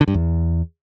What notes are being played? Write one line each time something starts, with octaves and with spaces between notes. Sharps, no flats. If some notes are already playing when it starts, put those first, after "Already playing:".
D3
G2
E2